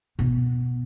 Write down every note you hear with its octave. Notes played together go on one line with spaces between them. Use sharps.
B2